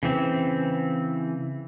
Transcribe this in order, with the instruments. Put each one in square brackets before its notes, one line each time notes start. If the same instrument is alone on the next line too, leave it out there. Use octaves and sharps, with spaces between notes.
[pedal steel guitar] C#3 E3 C4